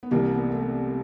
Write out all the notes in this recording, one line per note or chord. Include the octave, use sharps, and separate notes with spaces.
B3
C2 C3 E3 A#3
B3
A3